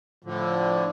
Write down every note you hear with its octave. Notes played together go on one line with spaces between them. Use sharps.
A2 D3 F3